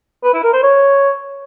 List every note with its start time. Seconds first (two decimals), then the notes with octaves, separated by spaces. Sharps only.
0.24 B4
0.34 E4
0.43 A#4
0.53 C5
0.63 C#5